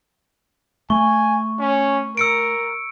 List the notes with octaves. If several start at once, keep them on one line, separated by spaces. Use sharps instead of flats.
A3 G#5 C#6
C#4
A#4 E6 C#7 D7